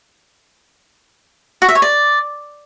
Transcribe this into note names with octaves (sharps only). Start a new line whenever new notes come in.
F#4
E5
C#5
D5